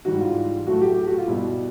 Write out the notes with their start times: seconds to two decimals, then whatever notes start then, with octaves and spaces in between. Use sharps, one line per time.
0.05 G#2 E3 G3 F#4
0.21 F4
0.67 A2 F#3 A3 F#4
0.82 G4
0.97 G4
1.07 F#4
1.18 F4
1.28 B2 G3 E4